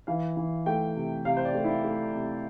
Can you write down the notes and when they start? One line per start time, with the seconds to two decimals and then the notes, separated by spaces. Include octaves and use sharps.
0.07 E3 F5
0.37 E3
0.66 A3 G5
0.96 C3
1.25 C3 F5
1.37 C5
1.45 D5
1.55 A3
1.64 E4
1.84 A3
2.14 C3